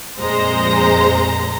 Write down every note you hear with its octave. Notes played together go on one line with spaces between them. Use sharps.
F2 A#2 G#3 C5 A#5